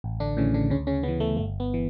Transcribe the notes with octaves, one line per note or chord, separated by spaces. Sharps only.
A1
D3 D4
A2 C#3 E3 C#4
D3 D4
D2 C#3 C#4
C#3 C#4
C#3 E3 B3
A3
G1 A3
B3
E3